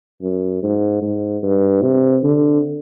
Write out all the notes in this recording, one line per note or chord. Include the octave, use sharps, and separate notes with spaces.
F#2
G#2
G#2
G2
C3
D3